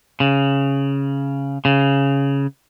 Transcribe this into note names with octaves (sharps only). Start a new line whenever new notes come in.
C#3
C#3